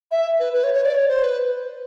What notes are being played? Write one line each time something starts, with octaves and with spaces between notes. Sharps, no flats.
E5
B4
B4
C#5
C#5
D5
C#5
C5
B4